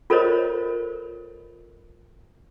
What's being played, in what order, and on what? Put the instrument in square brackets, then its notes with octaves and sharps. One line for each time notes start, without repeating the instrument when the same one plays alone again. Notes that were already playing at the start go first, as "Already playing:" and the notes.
[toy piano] F4 A4 A#4 C5 C#5 D#5